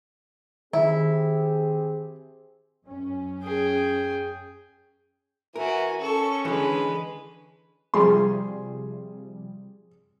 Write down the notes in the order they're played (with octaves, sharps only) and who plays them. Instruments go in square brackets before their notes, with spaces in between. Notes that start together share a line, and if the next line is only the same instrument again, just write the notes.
[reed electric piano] D#3 [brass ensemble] C4 G4 G#4 [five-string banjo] E4
[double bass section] F#2 C#4
[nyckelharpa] G#4 G5
[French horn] E3 [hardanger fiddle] F#4 G#5 [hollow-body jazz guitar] A#4
[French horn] C#4 [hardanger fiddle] A4 C#6
[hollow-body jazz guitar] D3 E3 [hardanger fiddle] G#3 B4
[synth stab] C3 F3 G3 [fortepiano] G#4 C6